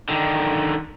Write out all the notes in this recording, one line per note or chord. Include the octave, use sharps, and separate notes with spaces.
D3 D#3